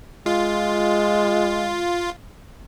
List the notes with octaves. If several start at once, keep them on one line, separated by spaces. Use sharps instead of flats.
G#3 F4